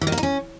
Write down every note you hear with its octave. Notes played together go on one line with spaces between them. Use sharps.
E3
D#3
A#3
D#4
C#4